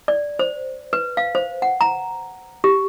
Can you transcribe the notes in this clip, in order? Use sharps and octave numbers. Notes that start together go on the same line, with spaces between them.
D5
C5
B4
F5
C5
F#5
A#5
G4